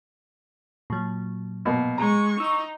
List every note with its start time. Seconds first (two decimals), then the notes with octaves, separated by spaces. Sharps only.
0.90 A#2 F#3
1.65 B2 A#3
1.98 G#3 A#5 C#6
2.40 D#4 C#6 E6